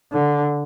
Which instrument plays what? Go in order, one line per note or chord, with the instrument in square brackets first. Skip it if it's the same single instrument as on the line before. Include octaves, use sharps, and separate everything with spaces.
[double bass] D3